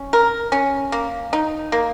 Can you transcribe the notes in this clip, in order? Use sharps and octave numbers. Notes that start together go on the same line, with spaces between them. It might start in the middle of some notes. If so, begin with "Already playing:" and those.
Already playing: C#4
A#4
C#4
A#3
D#4
A#3